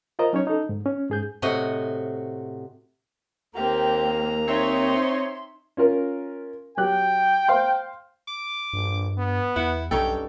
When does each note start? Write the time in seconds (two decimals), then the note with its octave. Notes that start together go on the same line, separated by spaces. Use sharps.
0.19 F4 A#4 C5 D#5 A#5
0.33 F#3 C#4 D#4 C#5
0.47 D#4 A4
0.69 G#2
0.86 C#4
1.09 G#2 G#4 G6
1.42 A2 C3 F#4 D#5
3.55 D#2 A#3 C4 G4 A#5
4.47 C4 D#4 C#5 E5 C6
5.77 C#4 F4 A#4
6.77 F#3 G4 G5 F#6
7.48 C5 F5 C6
8.27 D6
8.73 A#1 G2
9.18 B3
9.56 E2 E4 F#5
9.91 B1 G2 C#4 D#4 A4 G5